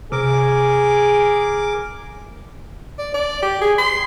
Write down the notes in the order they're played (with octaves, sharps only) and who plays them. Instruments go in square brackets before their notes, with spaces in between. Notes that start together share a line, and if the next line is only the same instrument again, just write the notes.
[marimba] C3 [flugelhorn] G#4 [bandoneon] A#4 D6
[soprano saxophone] D5
D5
G4
G#4
C6